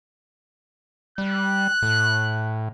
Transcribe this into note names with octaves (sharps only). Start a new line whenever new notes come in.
G3 F#6
A2